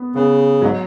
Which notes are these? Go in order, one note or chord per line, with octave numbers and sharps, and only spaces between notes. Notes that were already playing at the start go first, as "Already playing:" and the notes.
Already playing: B3
C#3 B3
G#2 F#3